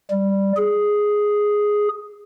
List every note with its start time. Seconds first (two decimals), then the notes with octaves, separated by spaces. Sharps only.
0.11 G3
0.57 G#4